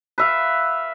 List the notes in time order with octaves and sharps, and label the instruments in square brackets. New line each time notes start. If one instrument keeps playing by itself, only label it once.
[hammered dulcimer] B4 E5 F5